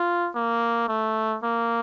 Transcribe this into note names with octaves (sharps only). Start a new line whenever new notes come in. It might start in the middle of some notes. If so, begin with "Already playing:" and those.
Already playing: F4
A#3
A3
A#3